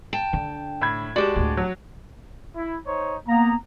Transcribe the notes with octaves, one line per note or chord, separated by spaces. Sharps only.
G5 A5
D3
A2 B5 G#6
G#3 F#4 G4 D5 A5
D2 A2
F#3
E4
D#4 C5 C#5
A#3 B3 A#5